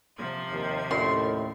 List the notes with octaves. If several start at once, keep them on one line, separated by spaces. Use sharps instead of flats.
C3 F3 G#6
D#2
D#2 A2 C#4 F4 D#5 C6